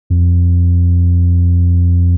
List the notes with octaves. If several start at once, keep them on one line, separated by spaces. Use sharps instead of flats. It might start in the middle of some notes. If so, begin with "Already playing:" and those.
F2